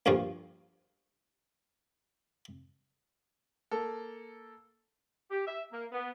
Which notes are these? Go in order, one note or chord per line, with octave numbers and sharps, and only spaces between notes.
D2 G2 A#2 F3 G3
A#3 A4
G4
E5
A#3
B3